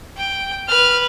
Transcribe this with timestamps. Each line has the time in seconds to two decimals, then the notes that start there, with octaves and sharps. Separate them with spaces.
0.17 G5
0.69 B4 F6